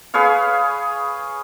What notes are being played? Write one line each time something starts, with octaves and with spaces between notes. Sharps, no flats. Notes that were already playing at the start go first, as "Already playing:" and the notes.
G#4 B4 C#5 F5